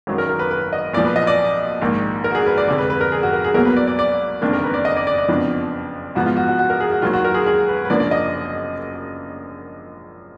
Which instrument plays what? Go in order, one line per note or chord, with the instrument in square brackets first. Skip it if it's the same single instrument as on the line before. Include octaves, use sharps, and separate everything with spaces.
[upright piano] G#1 F#2 D#3 F#3
A#4
A#4
B4
B4
D#5
B1 A#2 F3 D5
B4
D#5
D5
A#1 G#2 D#3 A#3
A#4
F#4
G#4
B4
D5
F1 F2 D3 G#3 D5
B4
B4
A#4
G#4
F#4
A#4
G#4
B1 B2 F#3 A#3 A#4
B4
D5
D5
D5
F#1 F2 D#3 A#3 D4
A#4
B4
D5
D#5
D5
D5
D5
F#1 F2 F3 B3 D4
G#2 F3 B3 F#4
F4
F#4
F#4
F#4
A#4
G#4
F#4
D#2 D#3 F#3 F4
F#4
A#4
G#4
G#4
B4
B4
F#1 F#2 F3 A#3 D4 D5
D5
D#5